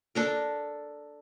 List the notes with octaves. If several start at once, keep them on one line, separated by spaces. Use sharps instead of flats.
D4 A4 A#4